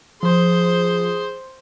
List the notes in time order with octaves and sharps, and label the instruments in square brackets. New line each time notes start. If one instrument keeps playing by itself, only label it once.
[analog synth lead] F3 [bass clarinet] G#4 [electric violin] C5